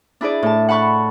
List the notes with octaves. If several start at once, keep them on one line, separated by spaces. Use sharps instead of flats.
D4 E4 G#4 D5
A2 A5
F#5 A5 B5 C#6 F#6